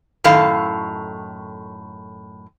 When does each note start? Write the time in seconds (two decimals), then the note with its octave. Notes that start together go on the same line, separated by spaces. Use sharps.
0.24 F#2 A2 D#3 A4 F5